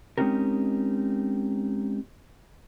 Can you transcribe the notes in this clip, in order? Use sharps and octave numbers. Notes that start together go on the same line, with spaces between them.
G#3 C4 C#4 D#4 G4 A#4